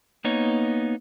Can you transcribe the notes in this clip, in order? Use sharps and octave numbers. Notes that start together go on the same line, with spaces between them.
A#3 B3 D#4 C#5